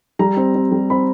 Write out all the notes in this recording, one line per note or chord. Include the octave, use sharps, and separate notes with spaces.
G3 A#5
C4
C4
G3
C4 B5